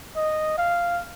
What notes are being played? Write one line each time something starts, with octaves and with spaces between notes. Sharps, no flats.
D#5
F5